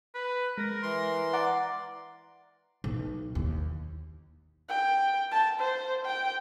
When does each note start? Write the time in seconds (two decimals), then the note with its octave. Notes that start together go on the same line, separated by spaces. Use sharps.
0.15 B4
0.58 G#3 A#4 A#6
0.83 E3 C6
1.33 D5 F#5 A#5
2.84 B1
3.35 D#2
4.69 G5
5.32 A5
5.60 C5
6.06 G5